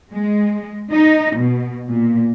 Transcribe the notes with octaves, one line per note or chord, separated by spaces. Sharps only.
G#3
D#4
B2
A#2